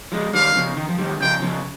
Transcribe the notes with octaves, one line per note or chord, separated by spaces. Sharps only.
F3 G#3
D#3 G3 F5
C#3 F3
D#3
F3
D#3 G3
C#3 F3 G5
C#3 F3